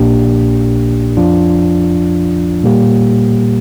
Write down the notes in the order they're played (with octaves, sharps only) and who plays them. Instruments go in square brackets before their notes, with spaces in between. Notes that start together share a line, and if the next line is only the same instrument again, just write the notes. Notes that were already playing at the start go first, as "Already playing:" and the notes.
Already playing: [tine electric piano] A#1 A#2 A#3 D4 G4
F2 F3 D4 F4
A#2 G3 A#3 G4